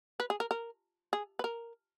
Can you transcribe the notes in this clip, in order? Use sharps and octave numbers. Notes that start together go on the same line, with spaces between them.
B4
G#4
A#4
A#4
G#4
B4
A#4